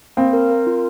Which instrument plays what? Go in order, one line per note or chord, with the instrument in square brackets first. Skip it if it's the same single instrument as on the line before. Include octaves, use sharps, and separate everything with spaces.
[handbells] A#3 [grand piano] C4
[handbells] A#4
A#4
F4